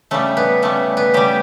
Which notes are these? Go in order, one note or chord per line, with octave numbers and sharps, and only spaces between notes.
C#3 G3 A3
B3
C#3 G3 A3
B3
C#3 G3 G4